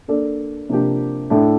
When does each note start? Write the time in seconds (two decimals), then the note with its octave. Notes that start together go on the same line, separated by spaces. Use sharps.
0.08 A#3 D4 A4 D5
0.69 C3 F3 A#3 D4 G4
1.30 A2 A3 D4